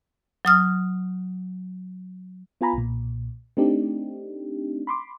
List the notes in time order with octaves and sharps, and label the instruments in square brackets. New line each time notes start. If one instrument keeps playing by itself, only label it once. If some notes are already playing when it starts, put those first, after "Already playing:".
[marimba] F#3 D#6 F6
[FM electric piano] B3 F4 G#5 A#5 B5
B1 A#2
A3 C4 D4 D#4 G4
B5 C6 D6